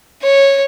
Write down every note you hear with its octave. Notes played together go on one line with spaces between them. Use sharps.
C#5